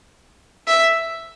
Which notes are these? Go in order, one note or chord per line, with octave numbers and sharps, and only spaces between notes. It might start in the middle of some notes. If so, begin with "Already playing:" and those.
E5